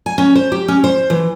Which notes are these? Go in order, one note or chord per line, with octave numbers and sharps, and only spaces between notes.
G#5
C#4
C5
G4
C#4
C5
E3